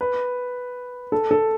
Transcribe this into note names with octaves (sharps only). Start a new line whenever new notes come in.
B4
A4
A4